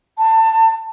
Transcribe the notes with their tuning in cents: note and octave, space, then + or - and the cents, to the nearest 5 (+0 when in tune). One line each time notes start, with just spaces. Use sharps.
A5 +25